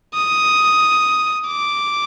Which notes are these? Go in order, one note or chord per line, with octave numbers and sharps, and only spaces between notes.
D#6
D6